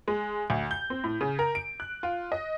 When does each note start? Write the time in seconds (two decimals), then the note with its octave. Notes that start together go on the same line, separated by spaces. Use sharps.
0.08 G#3
0.50 D2
0.71 G6
0.90 C4
1.04 A2
1.21 C#3
1.39 A#4
1.55 D7
1.80 F#6
2.03 F4
2.32 D#5